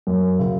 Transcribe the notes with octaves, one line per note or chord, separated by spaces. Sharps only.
F#2
C#3 F#3